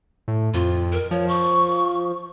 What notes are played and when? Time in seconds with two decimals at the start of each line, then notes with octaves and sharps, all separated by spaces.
0.28 A2
0.54 F2 F4
0.92 A#4
1.11 F3 C#5
1.29 C#6